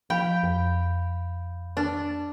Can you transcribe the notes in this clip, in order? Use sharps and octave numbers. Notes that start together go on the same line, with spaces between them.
F3 F5 G5 B5 G6
F2
D4